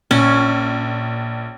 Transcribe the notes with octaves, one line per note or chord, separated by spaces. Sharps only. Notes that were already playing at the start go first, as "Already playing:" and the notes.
A#1 C#4